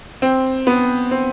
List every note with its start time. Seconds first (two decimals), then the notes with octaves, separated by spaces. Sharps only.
0.22 C4
0.67 B3
1.11 C4